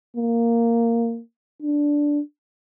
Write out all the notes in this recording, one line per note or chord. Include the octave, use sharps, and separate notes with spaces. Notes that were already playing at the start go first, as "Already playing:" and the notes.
A#3
D4